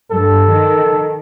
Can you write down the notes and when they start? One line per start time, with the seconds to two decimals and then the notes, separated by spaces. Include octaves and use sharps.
0.11 G2 A4
0.51 D#3